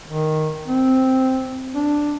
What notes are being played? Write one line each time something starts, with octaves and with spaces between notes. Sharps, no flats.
D#3
C4
D4